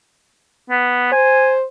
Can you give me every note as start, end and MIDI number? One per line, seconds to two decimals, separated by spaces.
0.70 1.10 59
1.12 1.65 72
1.12 1.52 80